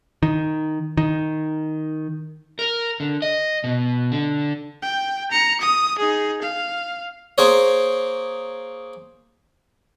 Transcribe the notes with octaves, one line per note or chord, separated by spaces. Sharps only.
D#3
D#3
A#4
D3
D#5
B2
D3
G5
A#5 C#7
D#6
D#4 G#4
F5
A#3 G#4 C5 C#5